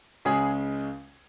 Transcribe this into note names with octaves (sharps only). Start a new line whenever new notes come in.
C#2 C#3 G#3 G#4